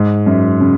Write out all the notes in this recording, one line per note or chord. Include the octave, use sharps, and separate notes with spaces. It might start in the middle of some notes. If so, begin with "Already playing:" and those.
Already playing: G#2
F#2
C#3